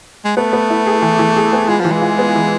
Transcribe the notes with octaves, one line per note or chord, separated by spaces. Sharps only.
G#3
A3 B3
B3
E4
G#4
E3
E3
G#4
B3
G#3 F4
E3 F3
G#3
F4
B3
E3